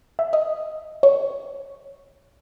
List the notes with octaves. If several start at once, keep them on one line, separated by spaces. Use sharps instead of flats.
E5
D#5
C#5